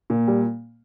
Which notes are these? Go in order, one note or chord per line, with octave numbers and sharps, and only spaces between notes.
A#2
G3